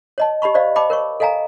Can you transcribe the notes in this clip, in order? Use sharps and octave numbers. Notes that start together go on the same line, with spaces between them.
C#5 D#5 A5
G4 D#5 B5 C#6
C5 D5 D#5 F5
D#5 G5 A5 B5 D6
A#4 C#5 C#6
A4 D#5 F5 G#5 A#5